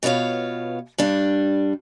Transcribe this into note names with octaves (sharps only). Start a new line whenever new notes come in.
B2 B3 F4 C#5 F5
G2 G3 D4